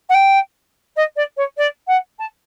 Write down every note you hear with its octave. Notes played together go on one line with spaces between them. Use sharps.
F#5
G5
D#5
D5
C#5
D5
F#5
A5